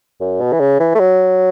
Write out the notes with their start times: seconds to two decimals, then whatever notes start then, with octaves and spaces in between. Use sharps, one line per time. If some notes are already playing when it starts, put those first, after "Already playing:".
0.21 F#2
0.41 B2
0.52 E3
0.60 C#3
0.80 E3
0.95 A3
0.99 F#3